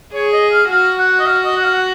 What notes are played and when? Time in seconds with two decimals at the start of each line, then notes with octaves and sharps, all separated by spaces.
0.14 G#4 C#5
0.33 D#5
0.52 F5
0.71 F#4 F5
0.99 F#5
1.20 D#5
1.26 F5
1.45 D#5
1.56 F#5
1.64 F5
1.73 F#5